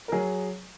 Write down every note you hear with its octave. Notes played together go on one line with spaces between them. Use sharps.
A#4
F#3 G#4